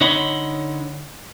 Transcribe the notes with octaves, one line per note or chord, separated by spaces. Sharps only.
D3 D#4 C#5 F#5 B5 C6